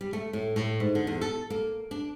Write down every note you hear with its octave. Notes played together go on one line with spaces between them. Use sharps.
G3
A3
A2
A2
G#2
D3
E2
A4
A#3
D4